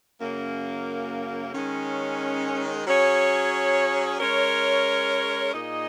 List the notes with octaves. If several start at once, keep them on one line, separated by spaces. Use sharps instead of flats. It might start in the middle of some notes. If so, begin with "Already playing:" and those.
F#2 C#3 A#3
D#3 G#3 C#4
F#3 C#4 G#4 C#5
G#3 C#4 A#4 C#5
A#2 A#3 D#4 G#4 D#5